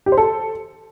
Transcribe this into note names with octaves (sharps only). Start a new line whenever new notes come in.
G4
C5
A4